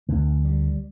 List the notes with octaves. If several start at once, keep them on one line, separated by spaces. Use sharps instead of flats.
D2 D3 A3
G3